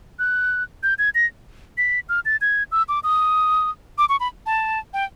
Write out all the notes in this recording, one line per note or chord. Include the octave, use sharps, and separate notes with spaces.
F#6
G6
G#6
A#6
B6
F6
A6
G#6
E6
D6
D#6
D6
C#6
B5
A5
G5